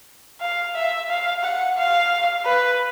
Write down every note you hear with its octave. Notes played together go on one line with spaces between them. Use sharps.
F5
E5
F5
F#5
F5
B4